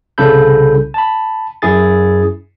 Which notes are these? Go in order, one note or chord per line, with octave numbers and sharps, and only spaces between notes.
C2 C#3 A4 B5 G6
A5 B5
F#2 E4 G#4 A6